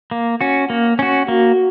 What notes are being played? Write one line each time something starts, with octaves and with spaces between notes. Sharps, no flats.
A#3
C#4 F#4
A#3
C#4 F#4
A#3 F#4